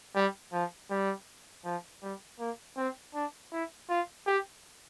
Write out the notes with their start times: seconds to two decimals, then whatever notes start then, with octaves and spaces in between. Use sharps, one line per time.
0.15 G3
0.53 F3
0.91 G3
1.65 F3
2.02 G3
2.40 A#3
2.77 C4
3.14 D4
3.52 E4
3.90 F4
4.27 G4